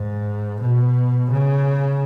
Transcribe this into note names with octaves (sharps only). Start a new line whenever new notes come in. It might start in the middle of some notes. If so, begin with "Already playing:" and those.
Already playing: G#2
B2
C#3